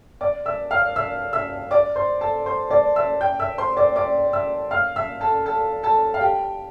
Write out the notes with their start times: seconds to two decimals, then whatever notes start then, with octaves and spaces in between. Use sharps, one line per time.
0.21 D5 D6
0.45 E5 E6
0.71 F5 F6
0.95 E5 E6
1.33 E5 E6
1.71 D5 D6
1.96 C5 C6
2.21 A4 A5
2.46 C5 C6
2.70 D5 D6
2.96 E5 E6
3.21 G5 G6
3.40 E5 E6
3.58 C5 C6
3.77 D5 D6
3.96 D5 D6
4.33 E5 E6
4.71 F5 F6
4.96 E5 E6
5.21 A4 A5
5.46 A4 A5
5.83 A4 A5
6.14 F5
6.21 G4 G5